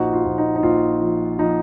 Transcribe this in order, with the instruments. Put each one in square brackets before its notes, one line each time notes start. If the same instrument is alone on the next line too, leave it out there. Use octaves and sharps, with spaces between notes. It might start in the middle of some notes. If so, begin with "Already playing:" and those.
Already playing: [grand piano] A#1 D#4 F#4
F4
A#1
D#4
D#4
A#1 F4
F3
F3 D#4